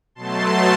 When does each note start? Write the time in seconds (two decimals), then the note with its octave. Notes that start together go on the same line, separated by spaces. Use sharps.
0.15 B2 F#3 A3 A5 C6